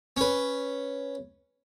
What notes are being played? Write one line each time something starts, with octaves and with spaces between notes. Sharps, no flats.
C#4 B4